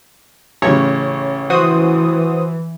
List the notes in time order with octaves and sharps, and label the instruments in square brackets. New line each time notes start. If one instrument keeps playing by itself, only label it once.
[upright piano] A1 C#3 [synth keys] C#5
[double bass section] E3 [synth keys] F#4 C5 D#6